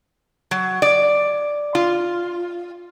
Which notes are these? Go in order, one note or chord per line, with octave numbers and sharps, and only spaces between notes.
F#3
D5
F4